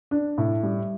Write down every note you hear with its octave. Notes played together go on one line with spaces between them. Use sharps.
D4
A2
G3